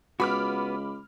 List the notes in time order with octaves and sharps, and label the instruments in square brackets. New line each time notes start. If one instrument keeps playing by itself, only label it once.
[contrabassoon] C#2 [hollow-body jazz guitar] B3 F#4 [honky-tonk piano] B5 D6 F6